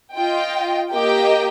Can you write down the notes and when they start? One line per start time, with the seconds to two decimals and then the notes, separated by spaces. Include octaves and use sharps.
0.15 F4 D#5 G5
0.91 A#3 G4 D#5 G5